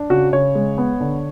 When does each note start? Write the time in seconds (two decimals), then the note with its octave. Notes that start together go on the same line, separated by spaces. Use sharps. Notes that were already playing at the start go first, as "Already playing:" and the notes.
Already playing: D4
0.10 C#3 F#4
0.32 C#3 C#5
0.55 G#3
0.78 B3
1.00 D3